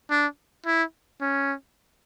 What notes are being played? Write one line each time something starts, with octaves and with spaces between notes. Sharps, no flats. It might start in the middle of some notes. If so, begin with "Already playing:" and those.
D4
E4
C#4